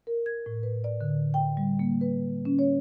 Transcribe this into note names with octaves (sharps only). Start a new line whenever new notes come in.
A#4
G#6
A2
B4
D5
D3
G5
G3
A#3
B4
C#4
C#5